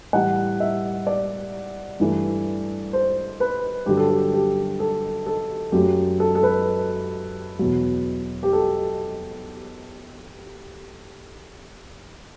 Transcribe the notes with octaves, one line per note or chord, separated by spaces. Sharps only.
A2 E3 G3 F#5
E5
D5
G2 E3 A3
C5
B4
G2 D3 F#3 G4
A4
G4
G4
A4
A4
F#2 F#3 A3 G4
A4
A4
B4
E2 B2 F#3
G4
A4